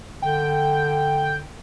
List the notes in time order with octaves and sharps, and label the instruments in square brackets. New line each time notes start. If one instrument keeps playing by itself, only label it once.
[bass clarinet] D3 [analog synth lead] G5